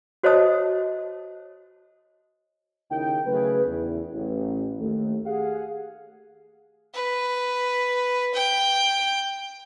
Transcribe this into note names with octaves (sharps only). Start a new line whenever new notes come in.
F#4 C5 C#5 D#5 A5 D#6
D#2 C#3 D#4 E4 A#4 G5
C#3 F#3 A3 G#4 B4
E2
A1
D#2 A3
G4 G#4 F5 F#5
B4
G5